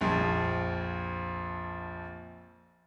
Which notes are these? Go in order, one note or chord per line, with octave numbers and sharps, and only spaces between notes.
A#1 F2